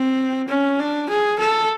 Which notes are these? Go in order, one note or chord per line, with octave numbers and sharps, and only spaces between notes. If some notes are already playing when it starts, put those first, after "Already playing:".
Already playing: C4
C#4
D4
G#4
A4